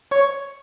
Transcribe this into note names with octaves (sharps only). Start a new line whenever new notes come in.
C#5